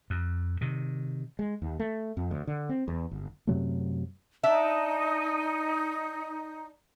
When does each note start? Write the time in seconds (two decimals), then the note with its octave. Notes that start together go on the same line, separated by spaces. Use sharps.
0.10 F2
0.61 C3 D#3
1.39 G#3
1.62 D#2
1.80 A3
2.17 F2
2.31 D2
2.47 D3
2.69 C4
2.88 E2
3.11 G1
3.47 F#2 C3 F#3 A3
4.43 D4 D#4 E5